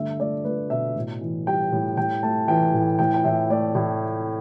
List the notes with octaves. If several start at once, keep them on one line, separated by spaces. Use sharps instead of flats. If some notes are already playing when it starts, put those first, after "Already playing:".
Already playing: G2 D3 A3 E5
A3 D5
A3 B4
B2 E5
A2
E3
G3 G5
A2
A2 G5
A3 A5
E3 G5
A2
A2 G5
G5
A2 E5
A3 D5
A2